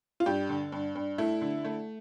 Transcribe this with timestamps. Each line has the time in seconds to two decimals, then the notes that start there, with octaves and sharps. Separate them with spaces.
0.20 F4
0.26 G2 G4
0.49 D3
0.72 G2
0.95 G2
1.18 A3 E4
1.42 D3
1.64 A3